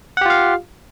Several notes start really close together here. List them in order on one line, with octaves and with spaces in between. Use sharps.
F#5 G4 F4 F5